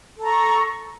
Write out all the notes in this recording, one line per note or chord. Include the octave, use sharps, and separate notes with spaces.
A4 A#5 C#6